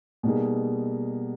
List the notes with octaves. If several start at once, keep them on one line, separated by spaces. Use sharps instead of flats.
B2 G3 A#3 D#4 G#4